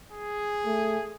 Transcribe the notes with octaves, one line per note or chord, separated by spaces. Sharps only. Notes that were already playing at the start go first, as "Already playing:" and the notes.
G#4
A3